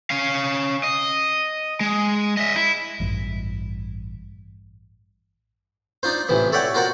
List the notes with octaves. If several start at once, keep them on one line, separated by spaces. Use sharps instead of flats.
C#4 F5
D#5
G#3
D#5 E5
E4
A1 G2
D4 D#4 F4 C5
A1 C3 E3 F3
A4 C#5 D5 E5 F#5 G5
F4 F#4 A#4 C5 F#5